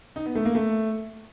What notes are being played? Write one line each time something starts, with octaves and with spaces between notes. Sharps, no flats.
D#4
B3
A3
A#3
A3